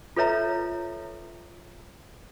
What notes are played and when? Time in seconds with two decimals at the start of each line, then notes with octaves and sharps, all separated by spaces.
0.16 F4 A4 B4 C#5 E5 A#5